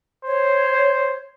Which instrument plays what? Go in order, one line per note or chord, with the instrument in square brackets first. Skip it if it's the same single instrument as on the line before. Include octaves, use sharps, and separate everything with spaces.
[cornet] C5 [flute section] C#5